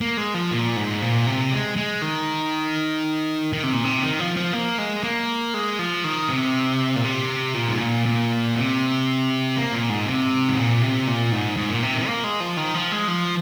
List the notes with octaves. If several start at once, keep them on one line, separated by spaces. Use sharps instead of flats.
A#3
G#3
F3
A#2
G#2
A#2
C3
G#3
G#3
D#3
D#3
C3
A#2
C3
D#3
F3
F3
A#3
G#3
A#3
G#3
F3
D#3
C3
A#2
C3
A#2
G#2
A#2
A#2
C3
A#3
A#2
G#2
C3
G#2
A#2
C3
A#2
G#2
G#2
A#2
C3
D#3
A#3
G#3
F3
D#3
F3
G#3
F3